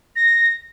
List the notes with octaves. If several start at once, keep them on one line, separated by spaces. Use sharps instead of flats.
A#6